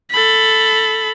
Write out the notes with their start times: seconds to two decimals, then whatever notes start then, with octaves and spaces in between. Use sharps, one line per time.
0.11 A4 B5